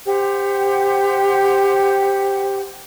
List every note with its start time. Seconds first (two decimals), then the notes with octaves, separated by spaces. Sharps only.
0.06 G4 C5 F#5